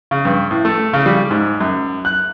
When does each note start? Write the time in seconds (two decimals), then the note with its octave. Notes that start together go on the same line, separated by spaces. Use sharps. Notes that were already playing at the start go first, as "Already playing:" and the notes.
0.11 C#3
0.25 G2
0.51 A2
0.65 A3
0.93 C#3
1.06 G3
1.31 G#2
1.60 F#2
2.05 F#6